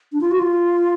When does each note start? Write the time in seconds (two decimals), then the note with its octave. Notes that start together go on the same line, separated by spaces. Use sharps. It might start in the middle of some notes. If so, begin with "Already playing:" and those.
0.13 D4
0.21 F4
0.31 F#4
0.39 F4